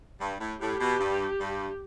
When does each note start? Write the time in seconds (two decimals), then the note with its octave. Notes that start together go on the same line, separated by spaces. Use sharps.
0.19 G2
0.39 A2
0.59 A2 G4
0.78 B2
0.98 G2
1.39 G2